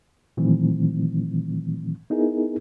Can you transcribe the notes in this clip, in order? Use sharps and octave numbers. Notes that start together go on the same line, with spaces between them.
A#2 D#3 E3 F#3 A3 C4
B3 D#4 E4 G#4 A#4